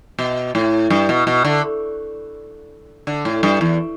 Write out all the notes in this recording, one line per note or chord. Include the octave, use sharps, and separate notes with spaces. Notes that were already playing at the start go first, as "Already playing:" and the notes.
B2
A2
G2
B2
B2
D3
D3
A2
G2
E2